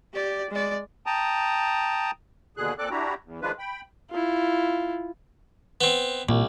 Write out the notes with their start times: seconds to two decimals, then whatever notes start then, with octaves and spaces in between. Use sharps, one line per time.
0.13 G4 D5
0.51 G#3 D5
1.06 G5 A5 A#5 D#6
2.57 D#2 B2 D3 G#4 F#6
2.78 A#2 C4 A4 D5 D6 F#6
2.90 D4 E4 F#4 G4 A#5
3.24 E2
3.42 D#3 F3 G#3 D4 F4 B4
3.59 G5 B5
4.10 E4 F4
5.81 B3 C4
6.29 C2 A#2